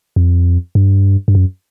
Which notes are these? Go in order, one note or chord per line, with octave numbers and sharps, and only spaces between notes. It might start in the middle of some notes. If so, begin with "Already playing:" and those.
F2
G2
G2
F#2